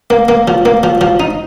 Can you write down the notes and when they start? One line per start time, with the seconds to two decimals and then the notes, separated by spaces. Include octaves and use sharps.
0.10 A#3
0.29 A#3
0.48 F3
0.65 A#3
0.83 F3
1.01 F3
1.20 D#4